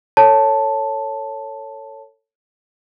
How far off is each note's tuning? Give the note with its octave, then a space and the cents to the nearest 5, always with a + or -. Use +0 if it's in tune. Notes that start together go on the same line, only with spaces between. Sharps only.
A4 +25 C#5 +0 A5 +0